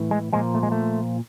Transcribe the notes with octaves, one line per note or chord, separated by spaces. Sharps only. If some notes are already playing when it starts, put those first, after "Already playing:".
Already playing: A2 E3
G#3
A#2 F3 G#3
A3
G#3
A3